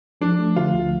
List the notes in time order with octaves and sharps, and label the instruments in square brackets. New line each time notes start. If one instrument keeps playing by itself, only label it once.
[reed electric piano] F3 [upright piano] D4
[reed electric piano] A3
[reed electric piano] D3 [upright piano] F4
[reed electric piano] D2